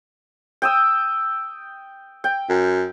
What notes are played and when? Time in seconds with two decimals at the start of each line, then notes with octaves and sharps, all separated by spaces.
0.62 G5 D#6 E6
2.24 G5
2.49 F#2